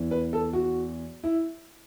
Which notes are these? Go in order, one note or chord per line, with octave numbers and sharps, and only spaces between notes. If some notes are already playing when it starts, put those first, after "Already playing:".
Already playing: E2 E3
B4
A4
F#4
E4